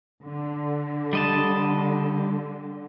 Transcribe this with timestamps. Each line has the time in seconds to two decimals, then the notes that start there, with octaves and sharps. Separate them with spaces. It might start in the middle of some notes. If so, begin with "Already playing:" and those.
0.22 D3
1.13 G3 D#5 A5